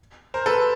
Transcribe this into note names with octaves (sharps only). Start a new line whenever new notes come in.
A#4 C5
A4 B4